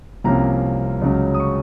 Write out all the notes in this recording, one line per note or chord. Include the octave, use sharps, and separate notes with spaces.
C2 C3 F3 A#3 C#4 A#5
C#2 C#3 F#3 C#4
D#6
C#6